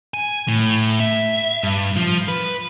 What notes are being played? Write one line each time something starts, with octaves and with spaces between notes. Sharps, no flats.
G#5
A2
E5
G2
F3
B4